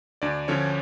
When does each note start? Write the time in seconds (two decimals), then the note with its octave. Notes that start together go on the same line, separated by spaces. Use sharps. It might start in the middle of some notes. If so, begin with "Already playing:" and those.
0.22 D2 D4 D5
0.48 D3 F3 C#4 C#5